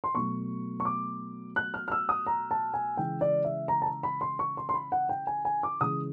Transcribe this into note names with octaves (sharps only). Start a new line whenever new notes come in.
C6
B2 F#3 A3 C#6
C#6
D6
F#6
F6
F6
E6
D#6
A#5
A5
G#5
C#3 E3 G#3 G5
D5
E5
A#5
A5
A#5
B5
C6
C#6
C6
C6
B5
F#5
G5
G#5
G#5
D6
C#3 E3 G#3 D#6